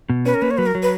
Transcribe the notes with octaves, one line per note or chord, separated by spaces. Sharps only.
B2
C#4 B4
A#4
A#3 B4
C#5
F#3 B4
A#4
F#3
B4